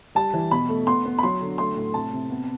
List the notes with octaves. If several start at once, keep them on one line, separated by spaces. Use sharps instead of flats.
G3 A5
E3
B2 B5
A3
B3 C6
B3
B5
F#3 C6
D3
A3 C6
A2
C3 A5
C3
B3